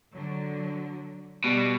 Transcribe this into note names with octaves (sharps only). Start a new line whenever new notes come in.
D3 F#3
B2 G3